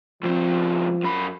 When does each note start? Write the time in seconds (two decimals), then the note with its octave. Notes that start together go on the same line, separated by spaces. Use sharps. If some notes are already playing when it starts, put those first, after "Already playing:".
0.23 C#2 F3 C4
1.04 F#2 B5